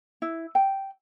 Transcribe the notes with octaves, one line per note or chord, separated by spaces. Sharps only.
E4
G5